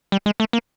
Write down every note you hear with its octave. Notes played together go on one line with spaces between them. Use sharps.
G3
G#3
A3
A#3